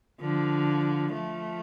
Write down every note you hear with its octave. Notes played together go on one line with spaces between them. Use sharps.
D3 F3
F3 A3